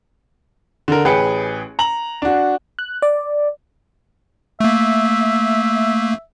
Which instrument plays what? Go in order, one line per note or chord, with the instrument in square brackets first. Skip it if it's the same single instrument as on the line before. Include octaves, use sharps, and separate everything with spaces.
[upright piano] D3 A#4
A1 G#4 B4 G5 C#7
A#5 F#7
D4 F#4
[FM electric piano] F#6
D5
[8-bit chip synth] A3 A#3 [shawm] E5